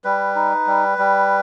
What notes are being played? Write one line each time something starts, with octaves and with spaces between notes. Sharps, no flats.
G3 B4
D#4
G3
G3